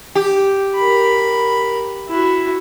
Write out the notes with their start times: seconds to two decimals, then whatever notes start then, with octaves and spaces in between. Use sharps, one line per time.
0.15 G4
0.76 A#4 B5
2.09 E4 F#4